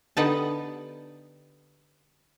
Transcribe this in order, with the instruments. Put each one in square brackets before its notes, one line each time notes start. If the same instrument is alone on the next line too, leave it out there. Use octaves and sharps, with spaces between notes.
[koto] D3 B3 D#4 G4 B4 A5